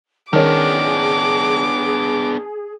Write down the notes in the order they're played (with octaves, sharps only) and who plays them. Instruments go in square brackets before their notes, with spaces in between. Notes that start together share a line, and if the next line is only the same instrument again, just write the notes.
[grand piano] D#3 C#4 [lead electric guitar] B3 D4 [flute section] G#4 [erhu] D6